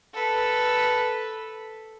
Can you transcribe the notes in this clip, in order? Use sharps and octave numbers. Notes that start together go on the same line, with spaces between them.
A4 B4